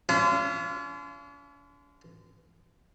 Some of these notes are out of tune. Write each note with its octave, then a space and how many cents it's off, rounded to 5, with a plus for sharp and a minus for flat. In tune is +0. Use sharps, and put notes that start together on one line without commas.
C#4 +45 F4 -35